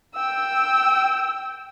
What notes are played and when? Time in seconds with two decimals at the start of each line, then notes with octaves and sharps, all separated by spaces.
0.15 G5 E6